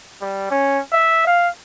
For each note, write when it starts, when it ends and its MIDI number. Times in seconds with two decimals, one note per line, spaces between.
0.21 0.47 55
0.51 0.80 61
0.92 1.26 76
1.27 1.48 77